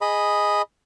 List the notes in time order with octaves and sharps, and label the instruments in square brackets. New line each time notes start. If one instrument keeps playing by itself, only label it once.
[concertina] G#4 D#5 B5